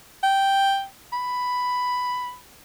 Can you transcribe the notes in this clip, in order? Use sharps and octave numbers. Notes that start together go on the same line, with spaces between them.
G5
B5